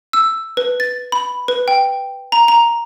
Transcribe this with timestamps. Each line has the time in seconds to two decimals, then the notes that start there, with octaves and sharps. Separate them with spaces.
0.13 E6
0.57 B4
0.80 A6
1.12 B5
1.48 B4
1.68 G5
2.32 A#5
2.48 A#5